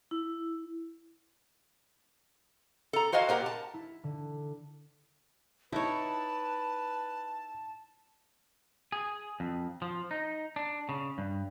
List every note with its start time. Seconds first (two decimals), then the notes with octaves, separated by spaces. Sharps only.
0.11 E4
2.93 A4 A#5
3.12 F#4 C5 D#5 F5 G#5
3.29 A#2 G4 A#4 F#5
3.46 A5
3.74 E4
4.04 D3
5.72 D#4 E4 B4 C#5 A5
8.92 G#4
9.40 F2
9.82 F3
10.11 D#4
10.56 D4
10.89 C#3
11.18 G2